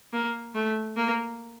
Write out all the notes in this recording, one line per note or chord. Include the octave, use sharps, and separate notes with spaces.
A#3
A3
A#3